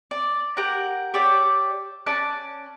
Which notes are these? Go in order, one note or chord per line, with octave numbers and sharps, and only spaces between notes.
D5
G4 A#4 F#5 A#5
G4 C#5 D5 E5
C#4 D5 A5 F#6